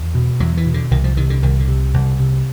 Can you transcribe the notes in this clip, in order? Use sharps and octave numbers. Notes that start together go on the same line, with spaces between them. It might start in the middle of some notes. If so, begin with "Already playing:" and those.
Already playing: E2
B2
E2 F#3
E3
B2
D3
C2 D#3
F3
C3 D#3
D3
C2 D#3
D3
C3
C2
C3